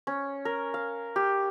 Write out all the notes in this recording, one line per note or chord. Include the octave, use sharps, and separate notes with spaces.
C#4
A#4
F5
G4